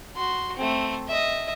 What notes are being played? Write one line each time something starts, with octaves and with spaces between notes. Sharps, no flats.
F#4 C6
A3 C4
D#5 E5